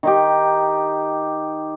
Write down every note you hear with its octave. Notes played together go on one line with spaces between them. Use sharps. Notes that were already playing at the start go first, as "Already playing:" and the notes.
D#3 D#4 G4